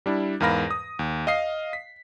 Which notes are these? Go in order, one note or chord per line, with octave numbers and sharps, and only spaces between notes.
G3 D4 E4
E2 G#2 A#4 F5 B5 A#6
D#6
D#2
D#5 F5 D#6 C7
B6